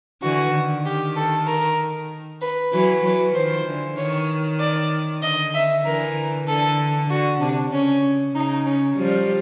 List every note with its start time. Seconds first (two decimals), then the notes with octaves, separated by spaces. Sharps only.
0.22 D3 E3 F#4
0.54 D#3
0.86 G4
1.16 A4
1.47 A#4
2.42 B4
2.73 E3 F#3 B4
3.04 E3 F#3 B4
3.35 D#3 F3 C5
3.67 D3 E3
3.98 D#3 C#5
4.60 D5
5.22 D3 D#5
5.54 E5
5.85 D3 E3 A#4
6.47 D3 A4
7.10 D3 F#4
7.41 C3 D4
7.73 C#3 C#4
8.35 C#3 D#4
8.66 C#4
8.98 F3 G3